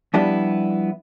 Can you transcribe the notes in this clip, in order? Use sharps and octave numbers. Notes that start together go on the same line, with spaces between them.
F3 G3 B3 D4 E4 G4